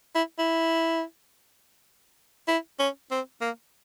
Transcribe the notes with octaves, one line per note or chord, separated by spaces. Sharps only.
E4
E4
E4
C#4
C4
A#3